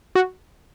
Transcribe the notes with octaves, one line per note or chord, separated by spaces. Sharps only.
F#4